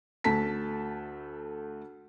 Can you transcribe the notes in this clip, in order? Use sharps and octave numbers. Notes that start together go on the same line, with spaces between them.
D2 A3 A5 B6